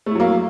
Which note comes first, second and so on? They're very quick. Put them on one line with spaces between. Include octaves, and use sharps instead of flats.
A3 E4 F#3 A#3